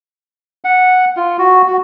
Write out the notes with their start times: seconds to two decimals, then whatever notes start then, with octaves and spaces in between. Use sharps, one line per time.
0.64 F#5
1.17 F4
1.39 F#4
1.68 F#4